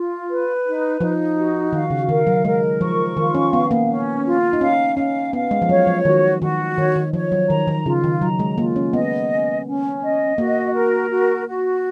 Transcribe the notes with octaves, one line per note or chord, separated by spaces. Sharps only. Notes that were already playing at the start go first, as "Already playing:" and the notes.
Already playing: F4
B4
D#4
F3 D#4
F#4
D#3 F5
C#3
D#3 A#4
F#3
G#3 A#4
F3 C#6
D#3 F4
C#4
B3 F5
A#3
C#4
F4
D#4
C#4 F5
C#4 F5
B3 F5
G#3
F3
F#3 C#5
F3
D#3 F#4
D#3 F#4
D#3 C#5
D#3
F3 C#5
F#3
D#3 A#5
D#3
C#3 F4
D#3
F#3 A#5
G#3
A#3 F4
C#4
B3 D#5
C#4
C#4
D#5
A#3 F#4
A#4
F#4
F#4